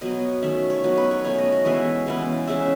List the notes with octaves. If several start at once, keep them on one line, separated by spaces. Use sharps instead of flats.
B2 F#3 B3 D#5
D#3 A3 C#4 E5
C#5
F#3 B3 D#4 B4
B4
C#5
B2 A3 C#4 C#5
D#5
D#5
E3 G#3 B3 E5
C#3 E3 B3
C#3 G#3 C#4 E5